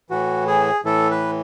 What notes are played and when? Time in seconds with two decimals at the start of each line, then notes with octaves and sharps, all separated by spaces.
0.10 A2 E3 F#4
0.47 G#4
0.85 A2 E3 A4
1.11 B4